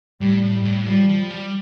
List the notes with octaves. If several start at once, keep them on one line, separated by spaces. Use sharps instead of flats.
A2 G3
A2
G3
G2
A2
F3 G3
F3
G3
G3